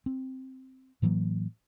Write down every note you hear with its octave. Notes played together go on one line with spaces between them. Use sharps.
C4
A2 E3 F#3 A#3